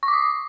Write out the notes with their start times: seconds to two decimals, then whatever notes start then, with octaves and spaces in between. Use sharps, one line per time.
0.03 C#6
0.08 D6
0.13 D#6